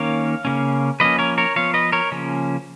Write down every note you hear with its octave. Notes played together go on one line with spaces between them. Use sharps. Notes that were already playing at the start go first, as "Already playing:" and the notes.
Already playing: D#3 A#3 C#4 C#5 F5
C#3 F3 A#3 C#4
F3 A#3 C#4 B4 D#5
A#4 C#5
A#4 C#5
F3 B3 C#5 F5
B4 D#5
A#4 C#5
C#3 F3 A#3 C#4